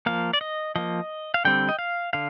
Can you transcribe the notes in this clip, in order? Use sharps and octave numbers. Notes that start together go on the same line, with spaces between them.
F3 A#3 F5
D5
D#5
F3 A#3 D#5
F5
D3 G3 C4 G5
D#5
F5
D3 F5